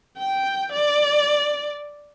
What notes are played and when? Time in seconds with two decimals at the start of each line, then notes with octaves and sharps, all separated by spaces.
0.17 G5
0.73 D5